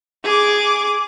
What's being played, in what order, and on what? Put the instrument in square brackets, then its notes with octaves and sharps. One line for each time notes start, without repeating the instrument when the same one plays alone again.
[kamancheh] G#4 D6